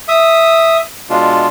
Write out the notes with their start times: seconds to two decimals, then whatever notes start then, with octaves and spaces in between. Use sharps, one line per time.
0.08 E5 D#6
1.10 B2 G#3 D4 F4